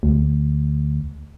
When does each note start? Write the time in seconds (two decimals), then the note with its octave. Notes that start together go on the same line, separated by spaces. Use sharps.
0.03 D2